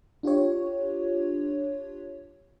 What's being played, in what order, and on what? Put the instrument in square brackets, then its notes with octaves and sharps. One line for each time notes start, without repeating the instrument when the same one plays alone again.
[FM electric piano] D4 F4 G4 C#5